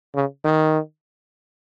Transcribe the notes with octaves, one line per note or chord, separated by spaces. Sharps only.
C#3
D#3